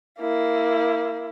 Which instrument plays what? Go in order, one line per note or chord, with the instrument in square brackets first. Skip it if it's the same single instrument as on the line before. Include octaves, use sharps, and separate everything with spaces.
[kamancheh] A#3 E4